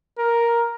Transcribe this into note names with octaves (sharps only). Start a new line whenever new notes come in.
A#4